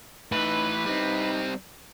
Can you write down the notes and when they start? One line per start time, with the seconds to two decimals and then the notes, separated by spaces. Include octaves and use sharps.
0.32 A2 E3 D#4 B4
0.86 G3 C4 D#4